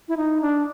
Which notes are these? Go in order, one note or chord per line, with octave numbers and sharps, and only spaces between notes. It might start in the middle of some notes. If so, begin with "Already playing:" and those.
E4
D#4
D4